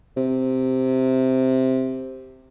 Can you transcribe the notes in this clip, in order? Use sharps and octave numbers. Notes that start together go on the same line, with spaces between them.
C3